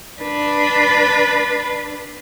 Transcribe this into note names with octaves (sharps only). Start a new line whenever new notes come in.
D4 B4